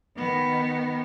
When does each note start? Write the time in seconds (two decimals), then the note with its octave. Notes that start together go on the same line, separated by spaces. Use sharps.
0.17 D#3 B3